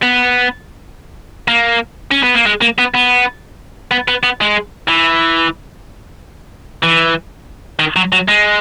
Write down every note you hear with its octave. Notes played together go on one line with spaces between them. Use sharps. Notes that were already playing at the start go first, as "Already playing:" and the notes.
B3
A#3
C#4
B3
A#3
G#3
A#3
B3
B3
B3
B3
B3
G#3
E3
E3
D#3
F#3
F#3
G#3